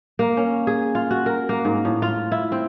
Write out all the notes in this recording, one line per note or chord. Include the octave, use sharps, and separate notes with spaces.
A#3
C#4
G#4
F4
F#4
A#4
A#3
G#2
A2
F4
E4
C4